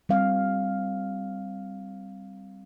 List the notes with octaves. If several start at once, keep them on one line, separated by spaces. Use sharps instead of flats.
G3 C4 F5